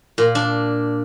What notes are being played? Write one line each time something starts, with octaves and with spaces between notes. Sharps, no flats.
A#2
D4